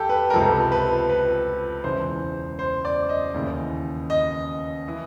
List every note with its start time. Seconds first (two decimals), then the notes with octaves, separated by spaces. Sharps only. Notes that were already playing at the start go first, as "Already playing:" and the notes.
Already playing: E2 G4 A4
0.09 B4
0.30 A#4
0.33 C#2 C3 F3 A4
0.72 B4
1.10 B4
1.84 E1 E2 C#3 E3 C5
2.59 C5
2.85 D5
3.09 D#5
3.34 D#2 C#3 E3
4.10 D#5
4.88 E3